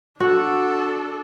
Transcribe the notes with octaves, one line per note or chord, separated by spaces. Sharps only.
D4 F#4 A4